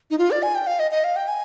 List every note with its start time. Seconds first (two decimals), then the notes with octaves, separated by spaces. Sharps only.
0.11 D#4
0.18 F4
0.31 D5
0.43 G#5
0.55 G5
0.67 F5
0.79 D#5
0.91 D#5
1.04 F5
1.16 G5
1.28 G#5